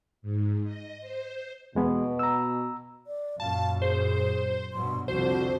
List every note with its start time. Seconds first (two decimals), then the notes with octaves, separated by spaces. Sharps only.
0.22 G#2
0.64 D#5
1.01 C5
1.75 E2 B2 G#3 B3
2.19 A#5 E6
3.07 D5
3.40 F#2 A#2 F5 A5
3.82 G#4 C5
4.73 G2 B2 F#3 C6
5.08 C2 F2 D3 F#4 C5